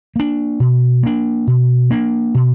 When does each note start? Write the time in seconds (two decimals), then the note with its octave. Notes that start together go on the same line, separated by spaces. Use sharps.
0.16 A#3 D4
0.60 B2
1.03 A#3 D4
1.47 B2
1.91 A#3 D4
2.35 B2